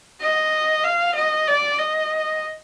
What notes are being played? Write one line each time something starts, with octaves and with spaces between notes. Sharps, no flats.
D#5
F5
D#5
D5
D#5